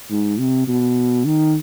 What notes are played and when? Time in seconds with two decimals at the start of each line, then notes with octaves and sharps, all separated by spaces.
0.11 G#2
0.40 C3
0.68 B2
1.25 D#3